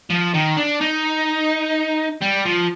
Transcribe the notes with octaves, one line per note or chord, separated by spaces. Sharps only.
F3
D#3
D4
D#4
G3
F3